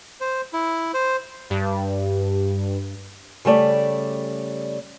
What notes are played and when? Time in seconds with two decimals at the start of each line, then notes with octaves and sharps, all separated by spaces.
0.21 C5
0.53 E4
0.94 C5
1.50 G2
3.45 C#3 G3 A3 D5